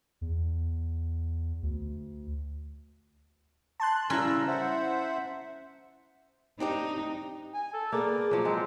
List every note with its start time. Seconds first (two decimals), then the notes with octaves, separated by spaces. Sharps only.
0.21 E2
1.63 D2
3.80 A5 C6 F#6
4.10 A2 C#3 G3 C#4 E4 A#5 E6
4.47 C5 E5 F#5
6.60 C4 D4 D#4 G4
7.54 G#5
7.74 A4
7.92 A#3 B3 G#4 D5
8.31 F3 F#3
8.45 G#3 C4